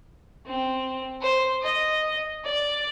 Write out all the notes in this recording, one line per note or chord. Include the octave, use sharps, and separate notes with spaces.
C4
C5
D#5
D5